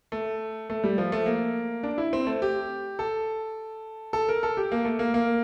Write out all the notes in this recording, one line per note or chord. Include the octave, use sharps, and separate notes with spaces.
A3
A3
G3
F3
A3
A#3
D4
E4
C4
A3
G4
A4
A4
A#4
A4
G4
A#3
A3
A#3
A#3